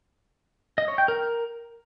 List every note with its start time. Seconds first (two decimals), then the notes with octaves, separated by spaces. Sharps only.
0.78 D#5
0.88 C#5
0.98 G5
1.08 A#4